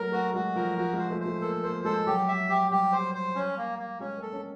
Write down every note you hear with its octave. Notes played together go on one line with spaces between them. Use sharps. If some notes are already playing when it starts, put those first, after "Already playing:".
Already playing: F#3 A3 A#3 A#4
A3 F#4
G#3 F#4
F3 A#4
F3 F#4
G#3
C5
A3
C5
A3
A#3 A4
A#3 C5
G#3 A4
F#3 G4
E5
G4
G3 G4
C5
C5
C#4
A#3
A#3
G#3 C#4
A#3
A4
C#4